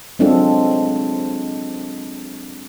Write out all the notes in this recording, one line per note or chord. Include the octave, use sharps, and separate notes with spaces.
F#3 G#3 C4 D4 F4 A4